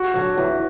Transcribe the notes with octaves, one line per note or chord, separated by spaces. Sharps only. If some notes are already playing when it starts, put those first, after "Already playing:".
Already playing: F#4
D3 F#3
E2